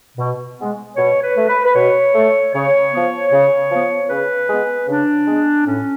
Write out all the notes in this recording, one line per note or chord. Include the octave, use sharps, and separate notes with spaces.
B2
G#3 B3
B2 C#5
B4
A3
B4
B4
B2 C#5
A3
C#3 C#5
F3 B3
C#3
F3 B3
C#3 B4
G#3 B3
C#3 D4
G#3 B3
A2 C#4